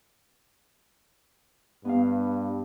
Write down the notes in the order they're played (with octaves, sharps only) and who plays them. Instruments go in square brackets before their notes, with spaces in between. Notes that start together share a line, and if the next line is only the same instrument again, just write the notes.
[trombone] G2 [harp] B3 F5